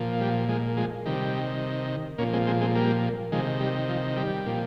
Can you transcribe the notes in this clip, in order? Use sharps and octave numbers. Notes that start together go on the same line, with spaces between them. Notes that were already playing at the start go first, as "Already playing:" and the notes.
Already playing: A#2 F3
G3
F3 G#3
F3 G#3
C3 D#3 G3
A#2 F3 A#3 C#4
G#3 C4
G#3 C4
G#3 C4
G3 A#3
C3 D#3 F3 G#3
G3
F3
G3
A#2 F3